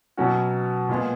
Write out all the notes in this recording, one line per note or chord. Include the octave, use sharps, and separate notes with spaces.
B2 F#3 C#4 F#4
A#2 G#3 B3